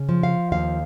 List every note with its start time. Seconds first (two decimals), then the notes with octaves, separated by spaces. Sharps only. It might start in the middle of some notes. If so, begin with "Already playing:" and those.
Already playing: C#3
0.09 F3
0.23 F5
0.52 D#2 F5